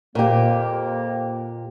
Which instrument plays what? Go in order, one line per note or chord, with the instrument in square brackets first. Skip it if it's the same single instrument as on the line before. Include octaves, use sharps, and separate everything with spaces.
[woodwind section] F2 A#3 [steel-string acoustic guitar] A#2 G4